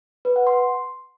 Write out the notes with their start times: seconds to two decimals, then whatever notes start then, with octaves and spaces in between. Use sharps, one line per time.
0.25 B4
0.36 F#5
0.47 C6